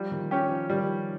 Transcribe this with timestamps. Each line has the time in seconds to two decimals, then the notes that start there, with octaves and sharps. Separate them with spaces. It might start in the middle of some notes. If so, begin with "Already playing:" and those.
Already playing: F3 G3
0.11 D#3
0.31 F3 C#4 G4
0.50 F3
0.70 D#3 G3